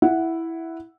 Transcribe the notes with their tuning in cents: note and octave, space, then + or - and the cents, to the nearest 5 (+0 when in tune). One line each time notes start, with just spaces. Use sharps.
E4 +0 F#5 -5